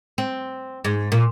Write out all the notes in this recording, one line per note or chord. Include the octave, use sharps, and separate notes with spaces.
C4
G#2
A#2